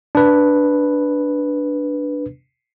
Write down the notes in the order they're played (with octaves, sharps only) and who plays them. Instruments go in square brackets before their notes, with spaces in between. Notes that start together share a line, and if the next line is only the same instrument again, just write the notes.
[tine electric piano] D4 B4